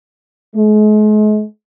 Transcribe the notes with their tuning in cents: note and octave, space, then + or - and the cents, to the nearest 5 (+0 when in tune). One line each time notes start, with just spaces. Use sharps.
G#3 +40